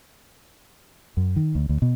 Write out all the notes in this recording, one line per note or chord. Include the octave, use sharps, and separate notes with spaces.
F#2
D#3
D2
D2
B2